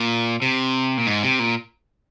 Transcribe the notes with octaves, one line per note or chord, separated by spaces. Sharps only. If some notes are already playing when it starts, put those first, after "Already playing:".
Already playing: A#2
C3
A#2
G#2
C3
A#2